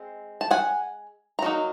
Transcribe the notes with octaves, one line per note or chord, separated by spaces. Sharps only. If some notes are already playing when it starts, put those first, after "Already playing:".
Already playing: G#3 C4
A5
F#5 G#5
A#5
F#3 A#3 D#4